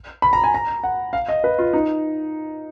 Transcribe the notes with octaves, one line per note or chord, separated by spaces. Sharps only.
B5
A#5
G#5
A#5
F#5
F5
D#5
B4
F4
D#4